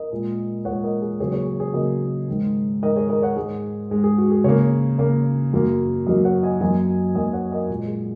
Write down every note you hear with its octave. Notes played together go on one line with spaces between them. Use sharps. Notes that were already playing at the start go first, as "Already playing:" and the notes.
Already playing: A#4 D#5
A#2 G#3
A#2 G#3 C#5 F#5
A#4 D#5
G#4
C#3 F#3 A#3 G#4 C#5
G#4 C#5
G#4
G#4 C#5
C#3 F#3 A#3 A#4 D#5
G#2 D#3 G#3
G#2 D#3 G#3 A#4 D#5
G#4 C#5
A#4 D#5
C#5 F#5
G#2 G#3 G#4
G#2 G#3 G#4
G#4
F#4
G#4
C#3 A#3 G#4 C#5
C#3 A#3
F#2 F#3 A#3
F#2 F#3 A#3 A#4 D#5
C#5 F#5
D#5 G#5
F#2 F#3 A#3 D#5 G#5
F#2 F#3 A#3 D#5 G#5
C#5 F#5
A#4 D#5
A#2 G#3
G#4